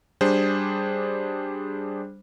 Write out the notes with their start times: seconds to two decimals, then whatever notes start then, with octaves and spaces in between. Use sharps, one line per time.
0.21 G3 D4 G#4 C5